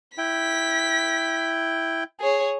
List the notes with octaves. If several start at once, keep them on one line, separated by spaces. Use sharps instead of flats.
E4 G5 B6
G#4 C#5